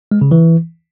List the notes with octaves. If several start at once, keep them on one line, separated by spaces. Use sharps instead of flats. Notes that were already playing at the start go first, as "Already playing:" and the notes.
G#3
C#3
E3